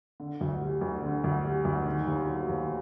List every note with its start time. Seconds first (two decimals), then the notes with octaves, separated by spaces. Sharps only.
0.20 D3
0.41 D2
0.62 G3
0.81 D2
1.03 D3
1.24 D2
1.44 G3
1.65 D2
1.86 D#3
2.07 D#2
2.27 F#3
2.48 D#2